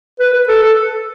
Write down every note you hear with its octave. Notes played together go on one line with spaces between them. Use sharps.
B4
B4
A4
A4